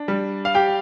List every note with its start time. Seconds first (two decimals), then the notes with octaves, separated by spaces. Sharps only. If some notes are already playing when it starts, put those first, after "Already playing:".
Already playing: D4
0.08 G3
0.45 F5
0.55 G4 G5